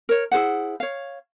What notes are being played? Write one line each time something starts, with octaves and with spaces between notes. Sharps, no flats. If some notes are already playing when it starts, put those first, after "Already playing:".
A#4 C#5
E4 G#4 C5 F#5
C#5 F5